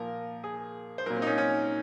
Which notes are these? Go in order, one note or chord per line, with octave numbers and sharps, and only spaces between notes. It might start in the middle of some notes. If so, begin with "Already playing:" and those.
Already playing: A#2 F3 A#4
G#4
C5
A#2 F#3 A#4
C4
D#4
C#4
C#4